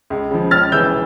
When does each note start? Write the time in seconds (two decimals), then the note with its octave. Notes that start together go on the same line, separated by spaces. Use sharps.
0.10 C#2
0.31 C#3 F3
0.51 C#2 F6 A6
0.72 C#3 E3 E6 G6